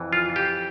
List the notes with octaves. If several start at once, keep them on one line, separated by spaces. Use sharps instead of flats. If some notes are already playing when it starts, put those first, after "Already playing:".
Already playing: F2 E3
F4
G4